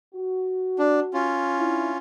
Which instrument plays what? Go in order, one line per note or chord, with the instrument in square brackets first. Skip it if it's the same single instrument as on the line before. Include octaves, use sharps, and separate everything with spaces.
[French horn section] F#4
[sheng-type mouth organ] D4
C#4 F4
[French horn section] D4 E4